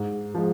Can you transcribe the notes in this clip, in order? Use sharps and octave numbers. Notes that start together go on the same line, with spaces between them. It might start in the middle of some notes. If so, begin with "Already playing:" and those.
Already playing: G#2
F3 G#3